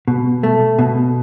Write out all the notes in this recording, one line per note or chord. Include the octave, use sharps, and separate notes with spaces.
B2
A3
B2